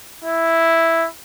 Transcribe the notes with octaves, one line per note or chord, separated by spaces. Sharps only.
E4